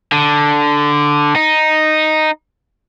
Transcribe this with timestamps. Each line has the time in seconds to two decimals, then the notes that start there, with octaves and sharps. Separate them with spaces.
0.12 D3
1.36 D#4